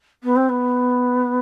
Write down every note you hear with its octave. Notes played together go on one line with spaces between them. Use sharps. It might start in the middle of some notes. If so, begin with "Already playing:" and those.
B3
C4
B3